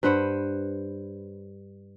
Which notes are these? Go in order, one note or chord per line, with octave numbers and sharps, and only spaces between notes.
G2 B4 C5 F#5